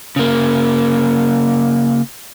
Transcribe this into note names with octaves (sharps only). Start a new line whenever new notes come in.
C#3 A#3